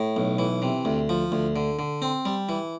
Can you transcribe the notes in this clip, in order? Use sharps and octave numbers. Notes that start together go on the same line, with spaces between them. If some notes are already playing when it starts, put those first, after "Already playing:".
Already playing: A2
B1
E3
C3
D2
F3
D2
D3
D3
C4
G3
E3